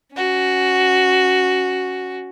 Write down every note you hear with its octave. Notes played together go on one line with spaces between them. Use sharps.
C#4 F#4